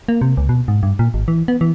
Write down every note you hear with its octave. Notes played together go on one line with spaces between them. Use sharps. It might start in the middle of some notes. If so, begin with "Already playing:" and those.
A#3
C3
C#2
B2
G#2
G2
A#2
G#1
E3
B3
E3